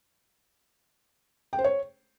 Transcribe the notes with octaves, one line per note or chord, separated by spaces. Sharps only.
G5
C5
C#5